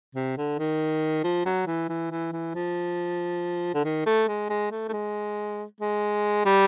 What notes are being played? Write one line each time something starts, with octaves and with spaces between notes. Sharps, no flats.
C3
D3
D#3
F3
F#3
E3
E3
E3
E3
F3
D3
D#3
A3
G#3
G#3
A3
A3
G#3
G#3
G3